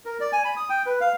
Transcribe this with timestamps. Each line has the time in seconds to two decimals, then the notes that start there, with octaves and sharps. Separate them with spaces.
0.05 A#4
0.20 D5
0.33 G#5
0.45 B5
0.57 D#6
0.70 G5
0.86 B4
1.01 F5